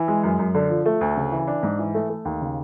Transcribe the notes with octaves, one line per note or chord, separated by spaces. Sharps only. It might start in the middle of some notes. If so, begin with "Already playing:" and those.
Already playing: E3
G#3
F#2
F#2
D3
F3
A3
D2
C#3
E3
D4
G#2
E3
A3
A3
D#2
C#3